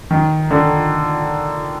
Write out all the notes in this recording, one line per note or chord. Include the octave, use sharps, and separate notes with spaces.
D#3
D3